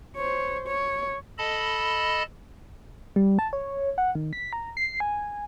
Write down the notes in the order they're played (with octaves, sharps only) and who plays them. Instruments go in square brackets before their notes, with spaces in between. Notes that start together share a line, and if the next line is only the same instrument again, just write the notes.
[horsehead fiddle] C5 C#5
C#5
[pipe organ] A4 D#5 A5 B5
[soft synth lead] G3
A5
C#5
F#5
D#3
B6
A#5
C7
G#5